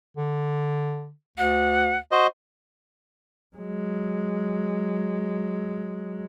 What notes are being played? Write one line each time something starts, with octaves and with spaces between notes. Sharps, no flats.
D3
D2 F#5
F#4 C5 D#5
F#3 G#3